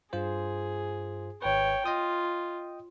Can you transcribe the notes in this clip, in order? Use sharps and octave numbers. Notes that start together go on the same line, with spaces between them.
G2 F4 G#4 C5
G#1 B4 C#5 G5
F4 D#5 G5 D#6